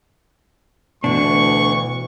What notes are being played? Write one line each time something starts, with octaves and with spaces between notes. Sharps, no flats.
D2 B2 E3 D4 C#6